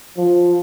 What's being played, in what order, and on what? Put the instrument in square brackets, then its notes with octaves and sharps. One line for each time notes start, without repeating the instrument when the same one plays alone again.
[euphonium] F3